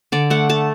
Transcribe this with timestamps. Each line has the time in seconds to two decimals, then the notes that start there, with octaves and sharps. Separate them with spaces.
0.12 D3 D5
0.30 A3 F#5
0.49 A3 A5